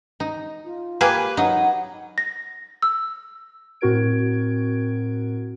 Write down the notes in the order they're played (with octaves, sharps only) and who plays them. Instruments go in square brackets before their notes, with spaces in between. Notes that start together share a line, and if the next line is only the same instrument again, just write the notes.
[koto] D#4
[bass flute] F4
[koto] A#3 G4 G#4 [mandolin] B4 G#5
[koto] F#3 D#4 [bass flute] F#5
[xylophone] A#6
E6
[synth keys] A2 C4 F#4 A#4 G#6 D7